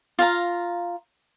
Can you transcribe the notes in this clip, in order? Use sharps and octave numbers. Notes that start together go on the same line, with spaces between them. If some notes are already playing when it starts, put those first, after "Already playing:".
F4 F5 A#5